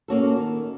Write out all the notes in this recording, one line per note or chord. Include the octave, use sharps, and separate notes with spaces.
A#3 C#4 F#4 A4
D#3